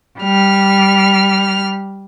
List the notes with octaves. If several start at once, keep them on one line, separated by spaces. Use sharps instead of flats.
G3 F6